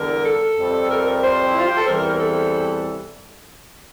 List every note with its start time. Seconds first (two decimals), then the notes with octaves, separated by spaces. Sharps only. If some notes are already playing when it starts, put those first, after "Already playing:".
Already playing: E2 D3 G3 A#4
0.25 A4
0.57 F2 C3 G3
0.90 A#4
1.06 A#4
1.22 C5
1.49 E4
1.58 F4
1.67 G4
1.77 A4
1.86 E2 C3 E3 G3 A#4
1.97 A#4
2.08 A#4
2.19 A4